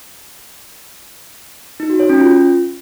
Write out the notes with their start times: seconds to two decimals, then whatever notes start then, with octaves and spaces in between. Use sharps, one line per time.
1.80 D#4
1.90 F#4
2.00 C#5
2.09 C#4
2.19 F4